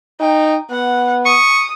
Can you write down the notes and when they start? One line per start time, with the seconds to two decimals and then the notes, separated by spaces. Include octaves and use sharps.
0.20 D#4 G5
0.71 B3 F#5
1.25 C#6 D#6